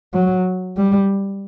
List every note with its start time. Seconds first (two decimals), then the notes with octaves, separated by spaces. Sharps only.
0.14 F#3
0.77 G3